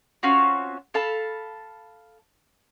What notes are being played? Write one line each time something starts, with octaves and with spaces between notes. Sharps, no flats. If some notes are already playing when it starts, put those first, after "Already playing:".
C4 C#4 F4 F#4
A4 F5 A5 B5